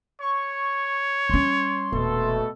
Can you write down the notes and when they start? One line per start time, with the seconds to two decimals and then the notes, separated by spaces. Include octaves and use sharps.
0.21 C#5 C#6
1.29 G3 C#4 C6
1.92 D#1 B2 A3 A4